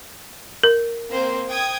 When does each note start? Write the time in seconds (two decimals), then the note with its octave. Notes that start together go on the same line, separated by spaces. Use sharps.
0.63 A#4
1.09 A#3 C4 C5
1.47 G5 D#6 G#6